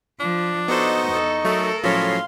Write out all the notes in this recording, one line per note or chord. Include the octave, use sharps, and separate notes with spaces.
F3 D4
B3 D#4 F#4 A4 C5 D#5 C#6
E2 A4
F#3 A3 A4 A#4
A2 F3 F#3 C#4 F5 C6